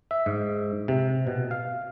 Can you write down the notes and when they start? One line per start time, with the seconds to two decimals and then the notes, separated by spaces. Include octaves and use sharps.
0.11 E5
0.26 G#2
0.88 C3
1.27 B2
1.51 F5